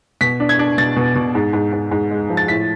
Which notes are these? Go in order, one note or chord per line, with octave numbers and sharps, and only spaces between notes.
B2 B6
D4
G#6
D4
B2 A6
B2
B2
G#2
G#2
G#2
G#2
G#3
F3
A6
A2 B6